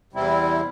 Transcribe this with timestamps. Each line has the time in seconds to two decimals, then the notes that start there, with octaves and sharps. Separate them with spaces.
0.13 E2 C3 G3 C4 E4